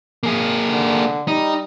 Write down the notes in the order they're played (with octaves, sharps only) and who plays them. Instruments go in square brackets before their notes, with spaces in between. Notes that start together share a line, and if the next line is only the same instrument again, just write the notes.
[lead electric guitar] A#3 G#4
[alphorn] D3
[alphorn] G3 [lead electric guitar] D#4